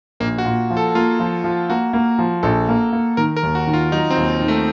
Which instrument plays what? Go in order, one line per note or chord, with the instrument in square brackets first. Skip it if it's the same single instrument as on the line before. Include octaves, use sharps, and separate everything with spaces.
[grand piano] A#1 [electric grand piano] A#3
[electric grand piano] F#4
[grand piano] A#2
F3
[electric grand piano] A4
[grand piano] A#3 [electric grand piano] F4
[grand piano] F3
F3
[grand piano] A#3 [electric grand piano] F#4
[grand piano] A#3
F3
[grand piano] A#1 [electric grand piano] A4
[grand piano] A#3
A#3
[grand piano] D#3 [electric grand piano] A#4
[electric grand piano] A#4
[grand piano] D#2
[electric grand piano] F#4
[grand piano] D#3
[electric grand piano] F4
[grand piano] F#3 [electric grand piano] D#4
[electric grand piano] C4
[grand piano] D#2
D#3
[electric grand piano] A3